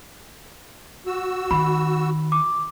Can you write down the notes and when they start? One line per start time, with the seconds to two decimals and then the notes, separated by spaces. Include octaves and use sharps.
1.07 F#4 E6
1.51 D#3 B5
2.32 D6